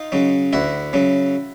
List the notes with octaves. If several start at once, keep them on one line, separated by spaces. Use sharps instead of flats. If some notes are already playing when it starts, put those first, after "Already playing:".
Already playing: D#4 F4
C#3 F#3
D2 E4 F#4
C#3 F#3